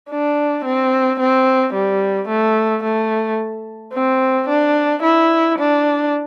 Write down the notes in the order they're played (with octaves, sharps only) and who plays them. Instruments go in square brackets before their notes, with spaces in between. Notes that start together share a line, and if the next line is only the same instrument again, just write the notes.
[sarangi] D4
C4
C4
G3
A3
A3
C4
D4
E4
D4